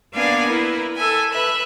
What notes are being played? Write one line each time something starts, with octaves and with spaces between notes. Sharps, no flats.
A#3 B3 D4 D5 F5 G#5
E4 A#4 B4
A4 E5 G#5
B4 E5 B5 F#6